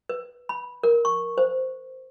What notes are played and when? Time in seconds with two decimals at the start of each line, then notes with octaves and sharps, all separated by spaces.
0.09 B4
0.49 B5
0.83 A#4
1.05 C#6
1.38 C5